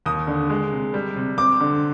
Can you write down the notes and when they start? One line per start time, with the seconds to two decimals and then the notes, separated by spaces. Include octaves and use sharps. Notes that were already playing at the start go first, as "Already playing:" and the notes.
0.06 D#2 D#6
0.27 D3
0.50 G#3
0.72 C3
0.94 G3
1.16 C3
1.38 C4 D6
1.60 D3